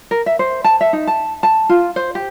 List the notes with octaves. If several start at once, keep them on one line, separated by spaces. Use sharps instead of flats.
A#4
E5
C5
A5
E5
D#4
A5
A5
F4
C5
G4